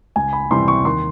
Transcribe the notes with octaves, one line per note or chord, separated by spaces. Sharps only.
C#2 G#5
B5
C3 E3 G3 C6
C#6
D#2 C6